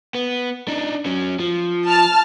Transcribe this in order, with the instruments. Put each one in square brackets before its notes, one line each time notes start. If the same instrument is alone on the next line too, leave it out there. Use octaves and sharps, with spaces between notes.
[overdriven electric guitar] B3
D4 D#4
F#3 C#4
F3
[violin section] A5 F6